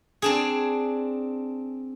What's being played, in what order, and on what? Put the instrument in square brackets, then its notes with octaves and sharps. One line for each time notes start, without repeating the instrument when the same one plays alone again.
[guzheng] C4 D4 G#4